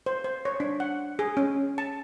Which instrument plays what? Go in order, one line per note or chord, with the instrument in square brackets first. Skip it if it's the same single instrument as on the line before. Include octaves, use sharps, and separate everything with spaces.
[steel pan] C5
C5
C#5
D4
F#5
G#4
C#4
A5